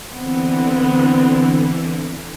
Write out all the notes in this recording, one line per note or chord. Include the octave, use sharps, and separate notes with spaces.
D3 E3 B3 C4